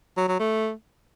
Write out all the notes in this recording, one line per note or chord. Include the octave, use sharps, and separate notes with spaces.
F#3
F#3
A3